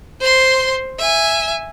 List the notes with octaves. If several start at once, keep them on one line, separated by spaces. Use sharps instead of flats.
C5 C6
E5 G#5